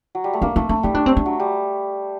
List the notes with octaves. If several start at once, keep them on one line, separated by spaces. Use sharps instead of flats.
F#3
G3
A3
A#3 D4
A3 D#4
A3 D4
G3 D#4
D4
C4
D4
F#3
G3